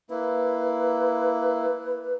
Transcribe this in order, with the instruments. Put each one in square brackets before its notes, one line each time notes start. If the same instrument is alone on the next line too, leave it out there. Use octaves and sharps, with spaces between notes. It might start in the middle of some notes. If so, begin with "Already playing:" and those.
[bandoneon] A#3 E4 [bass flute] B4